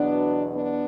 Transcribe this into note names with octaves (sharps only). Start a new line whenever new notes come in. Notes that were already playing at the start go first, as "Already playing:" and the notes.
Already playing: E2 B2 F#3 B3 D4
B3 D4